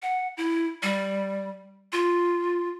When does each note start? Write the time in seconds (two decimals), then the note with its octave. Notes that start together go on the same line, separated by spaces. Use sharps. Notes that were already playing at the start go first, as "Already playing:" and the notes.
0.02 F#5
0.37 E4
0.83 G3
1.93 F4